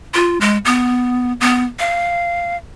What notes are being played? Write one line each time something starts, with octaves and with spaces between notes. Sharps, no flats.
F4
G#3
B3
B3
F5